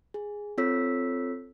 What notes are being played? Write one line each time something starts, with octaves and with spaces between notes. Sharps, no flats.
G#4
C4 F4 A4 C#5 E6 B6